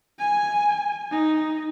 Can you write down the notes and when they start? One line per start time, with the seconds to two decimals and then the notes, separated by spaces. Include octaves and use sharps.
0.19 G#5
1.11 D#4